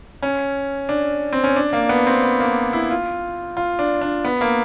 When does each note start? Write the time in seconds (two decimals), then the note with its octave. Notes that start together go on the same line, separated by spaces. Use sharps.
0.23 C#4
0.89 D4
1.33 C4
1.44 C#4
1.56 D4
1.73 A#3
1.89 B3
2.07 C4
2.23 B3
2.40 A#3
2.73 E4
2.91 F4
3.57 F4
3.79 D4
4.01 D4
4.25 B3
4.41 A#3